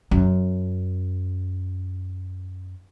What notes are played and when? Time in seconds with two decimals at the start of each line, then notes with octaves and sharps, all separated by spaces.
0.11 F#2 C#4